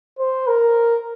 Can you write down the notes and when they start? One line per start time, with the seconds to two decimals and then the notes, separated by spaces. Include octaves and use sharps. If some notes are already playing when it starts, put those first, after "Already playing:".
0.19 C5
0.47 A#4